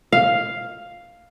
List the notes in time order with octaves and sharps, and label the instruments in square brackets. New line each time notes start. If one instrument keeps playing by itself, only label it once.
[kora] F5